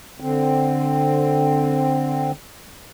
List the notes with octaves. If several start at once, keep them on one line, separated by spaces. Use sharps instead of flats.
D3 C4